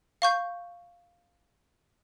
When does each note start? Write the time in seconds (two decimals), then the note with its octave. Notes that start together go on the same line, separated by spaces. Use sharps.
0.22 F5 C#6 G6